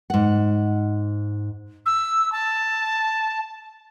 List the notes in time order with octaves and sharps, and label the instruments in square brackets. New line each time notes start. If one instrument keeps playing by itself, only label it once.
[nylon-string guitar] G#2 F#5
[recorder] E6
A5